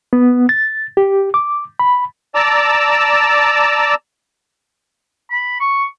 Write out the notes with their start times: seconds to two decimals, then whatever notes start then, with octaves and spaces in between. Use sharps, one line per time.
0.13 B3
0.49 A6
0.97 G4
1.34 D6
1.79 B5
2.35 D5 A5 A#5 D6 E6
5.30 B5
5.60 C#6